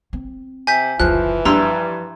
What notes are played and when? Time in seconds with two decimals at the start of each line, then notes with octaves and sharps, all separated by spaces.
0.13 C4
0.67 C3 G#5 G6 B6
1.00 F#1 D2 E3 F3 F#6
1.45 G2 F3 A#5 C6 E6